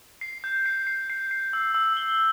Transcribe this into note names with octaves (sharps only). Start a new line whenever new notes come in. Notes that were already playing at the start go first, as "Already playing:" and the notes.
C7
G6
C7
C7
C7
C7
E6
E6
G7